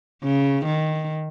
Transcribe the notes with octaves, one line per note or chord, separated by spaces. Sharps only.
C#3
D#3